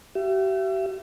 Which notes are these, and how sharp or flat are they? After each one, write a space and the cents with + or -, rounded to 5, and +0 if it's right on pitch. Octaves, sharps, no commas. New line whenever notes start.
G4 -40 E5 +35